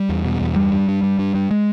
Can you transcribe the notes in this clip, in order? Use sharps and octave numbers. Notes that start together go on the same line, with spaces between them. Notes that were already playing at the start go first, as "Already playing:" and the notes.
Already playing: G3
E2
B2
E2
G2 G3
G2
G2
G2
G2
G2
G#3